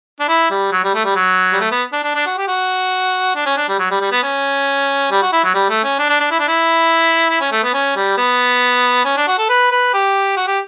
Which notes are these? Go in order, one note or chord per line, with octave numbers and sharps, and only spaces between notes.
D4
E4
G3
F#3
G3
A3
G3
F#3
G3
A3
B3
D4
D4
D4
F#4
G4
F#4
D4
C#4
D4
G3
F#3
G3
G3
B3
C#4
G3
F#4
E4
F#3
G3
A3
C#4
D4
D4
D4
E4
D4
E4
E4
C#4
A3
B3
C#4
G3
B3
C#4
D4
F#4
A4
B4
B4
G4
F#4
G4